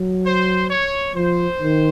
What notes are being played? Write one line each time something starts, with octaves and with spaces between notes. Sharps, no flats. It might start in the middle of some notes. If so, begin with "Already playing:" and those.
Already playing: F#3
C5
C#5
F3 C5
D#3